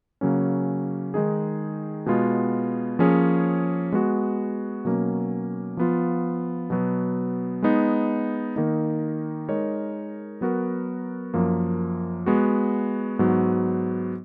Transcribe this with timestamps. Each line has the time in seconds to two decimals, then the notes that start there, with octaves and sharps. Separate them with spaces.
0.21 C#3 F#3 A#3 C#4
1.14 D#3 G#3 D#4 G#4
2.06 B2 G#3 B3 F4
2.99 F3 A#3 C#4 G#4 C#5
3.92 G#3 B3 F#4
4.85 B2 F#3 A#3 C#4
5.77 F3 B3 F4
6.70 B2 F#3 B3
7.62 G#3 B3 D#4
8.56 D#3 A#3 D#4
9.49 G#3 D#4 A#4 C#5
10.41 F#3 B3 F#4 A#4
11.34 F#2 F3 A#3
12.26 G#3 B3 F#4
13.19 G#2 F#3 B3 F#4